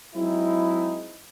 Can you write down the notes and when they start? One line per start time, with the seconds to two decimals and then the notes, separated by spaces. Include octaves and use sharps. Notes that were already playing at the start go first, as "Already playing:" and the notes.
0.14 F#3 G#3 C4 D#4 E4